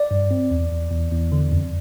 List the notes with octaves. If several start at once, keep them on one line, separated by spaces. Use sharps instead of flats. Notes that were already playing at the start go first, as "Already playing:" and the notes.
Already playing: D5
G2
C4
E2
E2
E2
E2
D3
F2